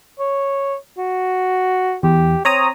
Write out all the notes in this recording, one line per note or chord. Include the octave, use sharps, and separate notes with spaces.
C#5
F#4
E2 G4
C4 C#5 A#5 D#6